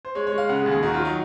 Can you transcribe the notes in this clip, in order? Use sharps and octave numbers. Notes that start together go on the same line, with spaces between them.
C5
G#3 C#5
C#5
G#3
F5
C#3 F#5
G#4
D#2
G#4
D#3 F#4
F4
F#3
D#4